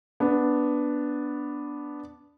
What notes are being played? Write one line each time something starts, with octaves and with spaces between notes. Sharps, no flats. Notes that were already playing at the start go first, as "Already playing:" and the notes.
B3 D4